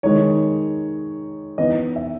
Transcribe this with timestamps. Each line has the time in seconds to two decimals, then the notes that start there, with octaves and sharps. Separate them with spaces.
0.03 D#3 G#3 D#4 C#5
1.58 E3 B3 D#4 D#5
1.96 E5